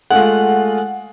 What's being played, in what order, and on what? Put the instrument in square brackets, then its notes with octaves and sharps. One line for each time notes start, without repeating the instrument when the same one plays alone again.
[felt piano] G#3 A3 F4 [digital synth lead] F#5